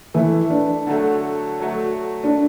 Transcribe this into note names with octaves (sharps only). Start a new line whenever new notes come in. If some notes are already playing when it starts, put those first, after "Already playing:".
E3 A3 E4 B4
D4
D3 F#3 A3 F#4 A4
F#3 A3 F#4
D4